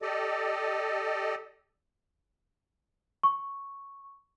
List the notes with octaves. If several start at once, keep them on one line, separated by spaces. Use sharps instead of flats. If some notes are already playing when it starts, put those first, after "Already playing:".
G4 A4 D5 D#5
C#6